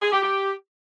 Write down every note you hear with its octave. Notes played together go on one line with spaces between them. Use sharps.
G#4
G4
G4